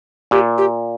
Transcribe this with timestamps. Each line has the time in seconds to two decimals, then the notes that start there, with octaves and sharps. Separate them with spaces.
0.31 A#2 G4
0.58 G4